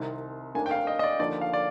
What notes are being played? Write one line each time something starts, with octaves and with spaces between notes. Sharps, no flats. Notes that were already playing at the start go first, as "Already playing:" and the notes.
Already playing: C2 C3 D#3
F1 D#2 D#3 A#3 D4 G#5
G5
F5
D#5
D#5
D5
D#2 D3 F3 A#3 D5
F5
D5